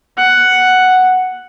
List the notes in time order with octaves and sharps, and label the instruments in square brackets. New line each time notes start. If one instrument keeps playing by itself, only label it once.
[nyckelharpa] F#5